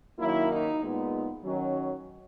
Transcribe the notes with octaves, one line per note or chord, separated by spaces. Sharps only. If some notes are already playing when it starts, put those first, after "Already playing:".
F#2 D#3 F#3 A#3 E4
D#4
A#2 G#3 B3 D#4
D#3 F#3 C#4